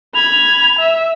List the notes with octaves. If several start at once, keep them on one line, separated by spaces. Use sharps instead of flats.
B5 G#6 F7
E5